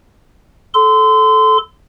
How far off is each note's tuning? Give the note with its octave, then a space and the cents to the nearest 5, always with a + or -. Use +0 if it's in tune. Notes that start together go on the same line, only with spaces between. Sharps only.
A4 -15 C6 -30